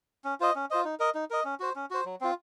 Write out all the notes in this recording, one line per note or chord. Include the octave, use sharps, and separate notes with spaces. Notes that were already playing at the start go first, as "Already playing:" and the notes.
C#4
F4 C5 D#5
C#4
F4 C5 D#5
D#4
A#4 D#5
D#4
A#4 D#5
C#4
F#4 C5
C#4
F#4 C5
F#3
C4 F4